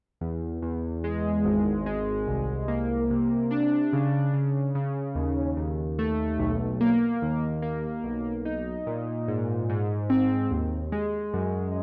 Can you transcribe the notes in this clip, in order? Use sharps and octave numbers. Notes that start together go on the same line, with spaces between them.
E2
E2
G#3
G#1
G#3
C2
A#3
C3
D4
C#3
C#3
C#3
D#2
D#2
A3
B1
A#3
D#2
A#3
B1
D#4
A#2
G#2
G#2
C4
D#2
G#3
F#2